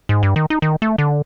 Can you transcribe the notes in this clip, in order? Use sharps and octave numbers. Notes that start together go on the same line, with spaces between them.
G#2
G2
D#3
D#4
D#3
A3
D3